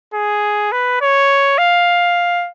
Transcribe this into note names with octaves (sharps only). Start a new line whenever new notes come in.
G#4
B4
C#5
F5